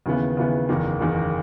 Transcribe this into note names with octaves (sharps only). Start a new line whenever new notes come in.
D#2 C#3 E3 B3
D#2 C#3 E3 B3
F#1 E2 D#3
F#1 E2 D#3